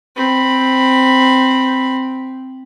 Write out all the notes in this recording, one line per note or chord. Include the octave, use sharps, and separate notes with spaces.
C4 B5